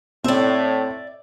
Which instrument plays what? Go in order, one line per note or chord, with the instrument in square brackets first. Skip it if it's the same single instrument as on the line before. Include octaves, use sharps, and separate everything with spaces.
[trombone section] A2 [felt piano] C4 [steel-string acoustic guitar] D5 E5